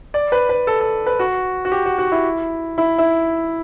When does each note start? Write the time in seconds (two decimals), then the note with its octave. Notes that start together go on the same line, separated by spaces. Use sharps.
0.14 D5
0.32 B4
0.49 B4
0.67 A4
0.80 A4
1.06 B4
1.19 F#4
1.65 F#4
1.72 G4
1.86 F#4
1.98 F#4
2.12 E4
2.78 E4
2.98 E4